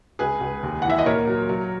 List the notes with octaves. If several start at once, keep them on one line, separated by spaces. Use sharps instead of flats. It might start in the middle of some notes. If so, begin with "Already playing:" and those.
C#2 G#4 B4
C#2
D#2
E3 F#5
E5
D#5
A#2 A#4 C#5
F#3
F#3